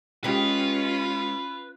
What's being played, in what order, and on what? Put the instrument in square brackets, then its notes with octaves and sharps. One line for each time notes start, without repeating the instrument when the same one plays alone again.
[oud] G#3 G4 [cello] C#4 [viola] F4 [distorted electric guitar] B4